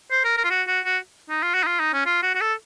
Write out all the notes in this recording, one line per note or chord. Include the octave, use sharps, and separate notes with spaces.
C5
A#4
A#4
F4
F#4
F#4
F#4
D#4
F4
F#4
D#4
F4
D#4
C#4
F4
F#4
F#4
A4